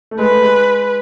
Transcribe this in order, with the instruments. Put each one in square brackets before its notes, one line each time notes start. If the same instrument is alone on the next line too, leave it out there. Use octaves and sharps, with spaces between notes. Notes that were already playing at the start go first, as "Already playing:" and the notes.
[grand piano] A3
[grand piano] G#3 [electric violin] B4
[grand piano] A3
G#3